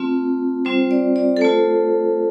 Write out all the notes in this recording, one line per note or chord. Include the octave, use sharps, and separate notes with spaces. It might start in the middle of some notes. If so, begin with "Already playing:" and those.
Already playing: A3 C4 F4
G3 C4 F4 C5
D5
D5
A4
A3 F4 C5